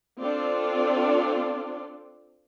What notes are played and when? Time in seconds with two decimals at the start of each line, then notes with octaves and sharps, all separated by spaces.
0.21 C4 D4 F4 A4 D5